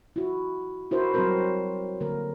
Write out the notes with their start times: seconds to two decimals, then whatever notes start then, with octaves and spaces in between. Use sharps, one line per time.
0.16 E4 F#4
0.91 D4 E4 F#4 A#4 C5
1.14 F#3 G3 C4 F#4 A#4 C5
2.01 D3 A#3 A#4